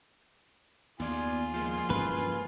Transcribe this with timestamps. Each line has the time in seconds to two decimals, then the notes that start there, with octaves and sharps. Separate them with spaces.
1.00 D#2 B3 F4 G#4 D5 G#5
1.54 F3 G#3 A#3
1.90 G2 E3 C#4 B4